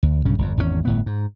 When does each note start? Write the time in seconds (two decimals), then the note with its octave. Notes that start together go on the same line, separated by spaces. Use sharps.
0.03 D2
0.25 B1 G2 C#3 C#4
0.38 G1 F2
0.57 G#1 E2 B2 C#4
0.85 G1 A2 B3
1.06 G#2